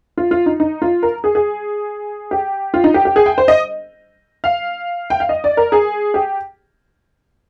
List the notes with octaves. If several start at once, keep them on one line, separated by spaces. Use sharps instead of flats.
F4
F4
D#4
D#4
F4
A#4
G#4
G#4
G4
F4
D#4
G4
G4
G#4
G5
C5
D#5
F5
G5
F5
D#5
D5
A#4
G#4
G4